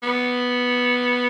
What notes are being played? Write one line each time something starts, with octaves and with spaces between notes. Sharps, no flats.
B3